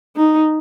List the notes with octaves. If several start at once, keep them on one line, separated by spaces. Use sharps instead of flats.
D#4